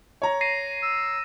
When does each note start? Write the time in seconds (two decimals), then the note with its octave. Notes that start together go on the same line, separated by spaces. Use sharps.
0.22 C#5 A#5
0.41 A#6 C7 D#7
0.83 E6